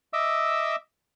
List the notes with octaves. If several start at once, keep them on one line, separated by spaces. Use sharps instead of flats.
D#5 E5 D6 E6